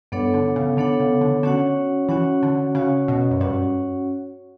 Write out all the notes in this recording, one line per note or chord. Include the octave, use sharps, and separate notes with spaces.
G2 B3 D4 A4 C#5 F#5
D3
C#3
D3 B3 D4 A4 C#5 F#5
C#3
D3
D3 C#4 F#4 C#5 F#5
E3 C#4 F#4 C#5 F#5
D3
C#3 C#4 F#4 C#5 F#5
B2
F#2
G2 C#4 F#4 C#5 F#5